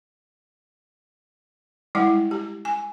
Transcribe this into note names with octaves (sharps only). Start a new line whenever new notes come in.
G3 G#3 E4 F#5 G5
G4
G#5